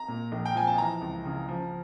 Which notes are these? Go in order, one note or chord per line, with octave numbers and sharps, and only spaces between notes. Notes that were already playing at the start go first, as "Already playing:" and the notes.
Already playing: A#5
A#2
A#1
G5
F3 G#5
A5
E3 A#5
C#2
C#3
F3